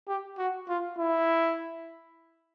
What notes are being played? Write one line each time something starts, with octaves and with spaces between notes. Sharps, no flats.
G4
F#4
F4
E4